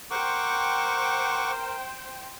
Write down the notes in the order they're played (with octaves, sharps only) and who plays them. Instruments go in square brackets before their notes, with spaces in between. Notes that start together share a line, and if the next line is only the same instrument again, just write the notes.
[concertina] A#4 [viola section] C5 G5 [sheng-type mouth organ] F#5 C#6 D6